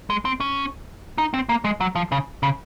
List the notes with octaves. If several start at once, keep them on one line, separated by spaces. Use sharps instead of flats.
G#3
C4
C#4
D#4
C4
A#3
G#3
F#3
F3
C#3
C#3